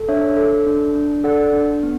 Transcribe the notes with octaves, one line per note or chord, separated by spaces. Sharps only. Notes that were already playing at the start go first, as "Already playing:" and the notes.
Already playing: A4
D4 C#5 E5
A4
D4
D4
A4 D5 F#5
D4
B3